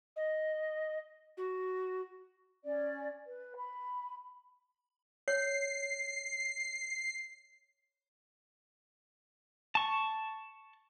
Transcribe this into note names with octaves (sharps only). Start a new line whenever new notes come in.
D#5
F#4
C#4 D5
B4
B5
C#5 C7
A5 C#6